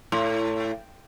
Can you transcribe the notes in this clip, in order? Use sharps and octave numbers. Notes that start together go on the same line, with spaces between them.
A2